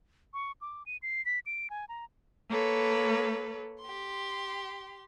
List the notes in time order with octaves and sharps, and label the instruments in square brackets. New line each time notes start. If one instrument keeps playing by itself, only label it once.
[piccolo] C#6
D6
D#7
C7
B6
D7
G#5
A#5
[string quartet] A#3 A4 B4 C#5
G4 C6